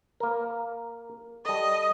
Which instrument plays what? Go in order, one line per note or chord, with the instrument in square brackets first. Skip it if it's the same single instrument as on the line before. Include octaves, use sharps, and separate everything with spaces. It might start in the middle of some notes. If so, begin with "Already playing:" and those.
[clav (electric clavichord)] A#3 A#4
[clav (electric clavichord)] G3 A4 [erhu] D#5